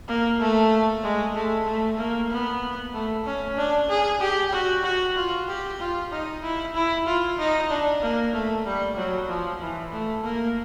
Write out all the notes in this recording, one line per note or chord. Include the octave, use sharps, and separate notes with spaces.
A#3
A3
G#3
A3
A3
A#3
B3
A3
C#4
D4
G#4
G4
F#4
F#4
F4
G4
F4
D#4
E4
E4
F4
D#4
D4
A#3
A3
G3
F#3
F3
E3
A3
A#3